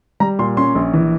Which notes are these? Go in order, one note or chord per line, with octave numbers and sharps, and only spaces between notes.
G3 A#5
A#2 C6
C#4 C6
A#1
E3